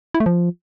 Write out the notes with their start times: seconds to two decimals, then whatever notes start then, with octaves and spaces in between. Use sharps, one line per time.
0.14 E4
0.20 A3
0.26 F3